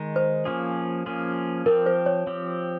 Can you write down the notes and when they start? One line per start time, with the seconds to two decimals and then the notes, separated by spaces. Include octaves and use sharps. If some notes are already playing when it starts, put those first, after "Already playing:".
Already playing: D#3 G#3 D#4
0.16 C5
0.45 F3 A#3 C#4 F4 G#4
1.06 F3 A#3 C#4 F4 G#4
1.66 F3 C4 G4 A#4
1.86 C5
2.06 C#5
2.27 F3 C4 G4